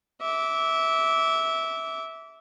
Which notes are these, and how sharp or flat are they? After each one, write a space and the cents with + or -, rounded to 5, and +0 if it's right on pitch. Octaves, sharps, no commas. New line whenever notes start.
E5 -15 D6 -25